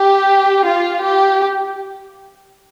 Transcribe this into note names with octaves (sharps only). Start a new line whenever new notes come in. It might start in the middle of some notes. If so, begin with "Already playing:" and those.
Already playing: G4
F4
G4